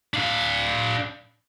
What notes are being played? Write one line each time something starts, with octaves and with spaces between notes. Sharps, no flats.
D4 F5